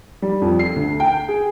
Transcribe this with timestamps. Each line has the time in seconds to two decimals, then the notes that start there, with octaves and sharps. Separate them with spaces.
0.22 G3
0.42 F2
0.59 C7
0.76 D2
1.00 G5
1.29 G#4